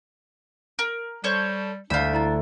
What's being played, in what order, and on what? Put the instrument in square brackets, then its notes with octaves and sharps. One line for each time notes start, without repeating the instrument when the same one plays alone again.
[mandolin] A#4
[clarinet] G3 [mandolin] A4 C5 C#5
[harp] D2 [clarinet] D4 [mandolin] F4 B5 [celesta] D5 G6 E7
[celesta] E4 A#5 A6